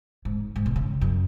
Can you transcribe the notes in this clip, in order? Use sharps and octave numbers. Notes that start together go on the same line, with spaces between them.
G#2
G#2
B2
C#3
F#2